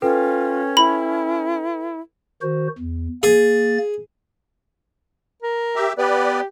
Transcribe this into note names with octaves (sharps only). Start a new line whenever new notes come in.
C#4 F4 A4 B4 G5
E4 B5
D#3 F#4 C5
E2
A#3 G#4 A6
A#4
G4 E5
B3 G4 B4 D5